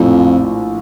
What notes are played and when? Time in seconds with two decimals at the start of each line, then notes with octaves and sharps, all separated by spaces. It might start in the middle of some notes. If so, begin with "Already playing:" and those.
Already playing: A#1 F2 A2 F3